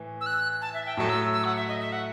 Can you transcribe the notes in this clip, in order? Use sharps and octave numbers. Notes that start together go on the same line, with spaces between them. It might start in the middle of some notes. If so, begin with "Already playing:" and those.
Already playing: A2 E3
E6
F#6
A5
E5
G5
A2 F#3 A3 A5
E6
E6
F#5
E5
D#5
E5
F#5